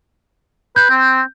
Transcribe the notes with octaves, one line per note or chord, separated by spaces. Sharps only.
B4 G6
C4